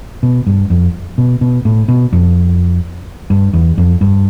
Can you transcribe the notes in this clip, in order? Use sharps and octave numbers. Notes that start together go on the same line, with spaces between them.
B2
G2
F2
B2
B2
A2
B2
F2
G2
E2
F2
G2